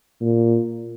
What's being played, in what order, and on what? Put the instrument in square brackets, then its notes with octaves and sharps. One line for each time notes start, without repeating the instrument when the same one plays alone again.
[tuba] A#2